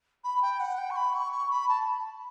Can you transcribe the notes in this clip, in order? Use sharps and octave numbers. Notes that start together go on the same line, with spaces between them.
B5
G5
F#5
G5
C#6
B5
C#6
C#6
B5
A5